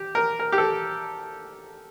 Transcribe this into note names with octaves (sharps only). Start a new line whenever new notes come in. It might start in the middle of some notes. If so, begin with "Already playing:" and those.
Already playing: G4
A#4
A#4
G4
A4